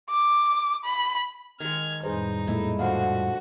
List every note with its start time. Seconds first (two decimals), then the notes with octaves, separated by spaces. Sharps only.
0.10 D6
0.85 B5
1.60 D#3 G#3 F6 G#6
2.04 F2 A2 G3 D#4 G#4 B4 C5
2.48 A#2 G#3 A3 E4
2.79 D3 F3 F#4 F5